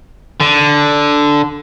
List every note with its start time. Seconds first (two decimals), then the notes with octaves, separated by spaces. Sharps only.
0.40 D3